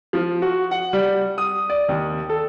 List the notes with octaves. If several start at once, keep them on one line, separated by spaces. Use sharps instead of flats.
F3
F#4
F#5
G3
D#6
D5
D#2
A4